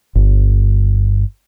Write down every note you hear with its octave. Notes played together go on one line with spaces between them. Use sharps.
G1